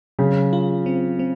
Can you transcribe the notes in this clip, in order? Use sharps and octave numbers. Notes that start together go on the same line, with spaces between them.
C#3 F#3
F4
C4
C4